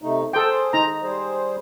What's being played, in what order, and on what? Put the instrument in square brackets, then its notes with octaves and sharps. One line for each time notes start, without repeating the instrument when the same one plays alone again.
[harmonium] C3 A3 D#4
[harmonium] G#4 C5 [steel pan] A4 G5
[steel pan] D#4 A#5
[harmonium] G3 G#4 C5